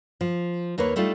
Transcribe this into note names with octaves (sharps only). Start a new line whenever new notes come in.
F3
D#2 A#3 B4 C#5
G3 A3 D4 D#4 F4